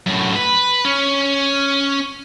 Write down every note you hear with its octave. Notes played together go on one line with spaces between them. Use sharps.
F#2 A2
B4
C#4